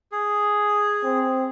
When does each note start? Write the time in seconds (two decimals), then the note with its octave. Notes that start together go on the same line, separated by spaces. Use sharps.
0.12 G#4
1.04 C4